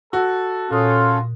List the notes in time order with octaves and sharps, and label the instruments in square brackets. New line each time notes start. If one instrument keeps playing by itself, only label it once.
[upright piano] F#4 [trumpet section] A4
[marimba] A#2 D#6 [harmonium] C#4 A4 [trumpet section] F4